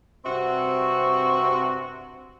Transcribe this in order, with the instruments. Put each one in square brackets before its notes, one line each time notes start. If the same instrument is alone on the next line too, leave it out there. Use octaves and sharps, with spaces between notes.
[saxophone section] G2 C3 C4 F#4 E5 F#5